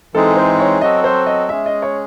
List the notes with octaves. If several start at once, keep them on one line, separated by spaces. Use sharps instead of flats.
E3 G#3 C4 D#4 G#4 A4
C5
C#5
F#3 C4 F#4 A4 D#5
C5
D#5
G#3 C#4 G#4 E5
D#5
C#5